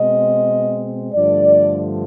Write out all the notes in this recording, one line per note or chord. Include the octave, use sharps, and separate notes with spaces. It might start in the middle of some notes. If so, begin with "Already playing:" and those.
Already playing: B2 G#3 C4 D#5
G2 D3 F3 A3 D5